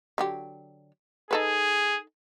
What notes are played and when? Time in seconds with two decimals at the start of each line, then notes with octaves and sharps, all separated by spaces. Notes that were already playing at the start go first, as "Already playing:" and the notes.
0.18 D3 F#3 G4
1.31 D#4 G#4 A4 B4